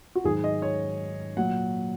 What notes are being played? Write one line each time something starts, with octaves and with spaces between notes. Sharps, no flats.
F#4
G#2 D#3 F#3 G#4
D#5
C#5
A#2 F#3 F#5